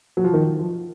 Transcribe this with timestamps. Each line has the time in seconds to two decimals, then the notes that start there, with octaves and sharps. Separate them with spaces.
0.17 F#3
0.24 F3
0.33 D#3
0.59 F3